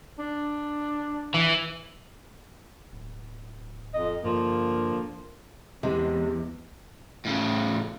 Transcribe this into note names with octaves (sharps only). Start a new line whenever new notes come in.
D4
E3
D1
F2 D#5
G2 D3 F3 A#3
E2 C3 G#3
A2 C#3